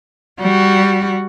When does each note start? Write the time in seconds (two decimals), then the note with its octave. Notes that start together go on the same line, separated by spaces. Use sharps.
0.39 G3 F#4